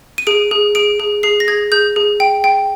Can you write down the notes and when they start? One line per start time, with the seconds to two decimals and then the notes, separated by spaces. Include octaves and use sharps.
0.18 D#7
0.27 G#4 D7
0.51 G#4
0.75 G#4 D7
1.00 G#4
1.23 G#4 C7
1.40 A#6
1.48 G#4 G#6
1.72 G#4 G6
1.96 G#4
2.20 G5
2.44 G5